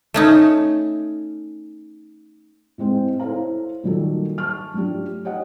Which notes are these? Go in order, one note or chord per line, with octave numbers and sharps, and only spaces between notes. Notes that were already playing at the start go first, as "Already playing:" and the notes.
A3 C#4 D#4
A2 G#3 C4
E4 A4 C5 C#5 F5 A#5
A#2 D#3 F#3 G3 F#4 A4
A5 C#6 F6
F3 F#3 A3 D4 G4
G4 C#5 D#5 F#5